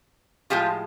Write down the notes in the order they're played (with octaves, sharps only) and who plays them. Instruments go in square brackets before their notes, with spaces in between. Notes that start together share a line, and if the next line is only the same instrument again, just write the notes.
[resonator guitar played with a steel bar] A2 F3 G#3 F4 G4